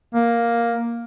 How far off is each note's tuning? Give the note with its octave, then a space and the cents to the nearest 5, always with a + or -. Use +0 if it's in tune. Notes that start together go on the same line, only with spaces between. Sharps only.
A#3 +5